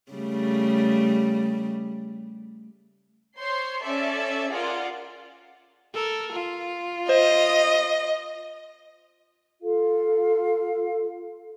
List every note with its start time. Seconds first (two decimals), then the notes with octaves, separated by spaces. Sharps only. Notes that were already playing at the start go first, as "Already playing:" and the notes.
0.12 C#3 G3 A3
3.38 C5 C#5 C6
3.84 C#4 A4 D5 E5
4.50 F4 G#4 A#4 D5 F#5
5.94 A4 A#4
6.32 F4
7.09 C5 D#5
9.61 F4 A4 F5